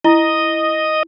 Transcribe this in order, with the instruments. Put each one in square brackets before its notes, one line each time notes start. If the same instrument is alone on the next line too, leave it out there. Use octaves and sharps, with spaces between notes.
[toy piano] E4 [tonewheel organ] D#5